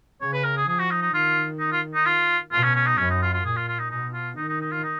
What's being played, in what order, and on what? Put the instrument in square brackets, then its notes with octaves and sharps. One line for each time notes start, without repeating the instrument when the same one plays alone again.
[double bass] C#3 [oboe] C#5
[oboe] B4
A#4
G#4
[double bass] F3 [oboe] G#4
[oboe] F#4
D#4
D#4
[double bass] D#3 [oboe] F4
[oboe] D#4
F4
D#4
F4
[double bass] B2 [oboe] F4
[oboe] C#4
C#4
D#4
[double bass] F#2 [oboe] C#4
[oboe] D#4
F4
F4
[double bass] A#2 [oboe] G#4
[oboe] F4
F4
D#4
[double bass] B2 [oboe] D#4
[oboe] F4
[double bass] D#3 [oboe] D#4
[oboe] D#4
D#4
F4
D#4